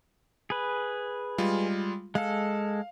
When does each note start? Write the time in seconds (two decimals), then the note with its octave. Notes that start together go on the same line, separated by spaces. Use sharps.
0.50 G#4 B4
1.38 G3 G#3 F4
2.15 G#3 A4 F5